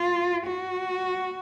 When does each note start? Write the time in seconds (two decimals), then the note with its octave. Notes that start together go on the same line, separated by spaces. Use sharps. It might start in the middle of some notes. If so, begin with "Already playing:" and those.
Already playing: F4
0.47 F#4